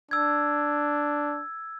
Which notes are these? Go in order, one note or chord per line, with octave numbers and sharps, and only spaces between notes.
D4 E6 G#6